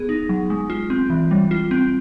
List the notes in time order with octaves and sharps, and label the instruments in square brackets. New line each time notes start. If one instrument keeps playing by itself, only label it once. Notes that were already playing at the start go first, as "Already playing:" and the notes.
Already playing: [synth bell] B3 G#4
D#4
F#3
G#3
F4
C4
E3
G3
F4
C4